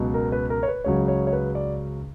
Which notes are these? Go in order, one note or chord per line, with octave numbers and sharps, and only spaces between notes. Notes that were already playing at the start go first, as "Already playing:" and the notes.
Already playing: C#2 B2 F#3
A#4
B4
A#4
C#5
B4
C#2 C#3 F#3 C#5
C#5
C#5
B4
D5